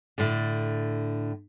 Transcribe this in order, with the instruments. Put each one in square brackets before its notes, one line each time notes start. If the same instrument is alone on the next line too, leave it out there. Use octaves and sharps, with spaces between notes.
[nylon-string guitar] A2 D3